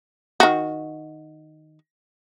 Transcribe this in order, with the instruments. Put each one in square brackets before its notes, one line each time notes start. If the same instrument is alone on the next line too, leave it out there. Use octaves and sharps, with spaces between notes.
[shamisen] D#3 F#4